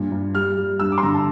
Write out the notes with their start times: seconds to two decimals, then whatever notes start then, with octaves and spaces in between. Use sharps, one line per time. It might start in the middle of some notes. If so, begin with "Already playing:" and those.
Already playing: G2 A#2
0.12 G2
0.35 G3 F6
0.58 G3
0.79 G2 E6
0.92 D6
0.98 C6
1.03 D3 A#5
1.14 A5